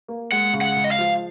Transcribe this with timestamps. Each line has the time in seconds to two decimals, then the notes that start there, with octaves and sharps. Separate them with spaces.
0.08 A#3
0.32 G#3 F#5
0.53 C#3
0.61 F#5
0.76 C#2
0.84 D#5
0.92 F5
0.99 F3